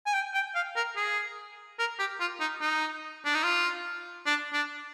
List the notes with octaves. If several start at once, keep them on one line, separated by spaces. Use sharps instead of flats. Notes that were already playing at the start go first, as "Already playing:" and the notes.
G#5
G5
G5
F5
A#4
G#4
A#4
G4
F4
D#4
D#4
D4
D#4
F4
D4
D4